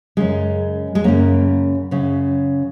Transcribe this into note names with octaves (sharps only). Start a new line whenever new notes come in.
F#2 C#3 G#3
G#3
F#2 C#3 A#3
F#2 C#3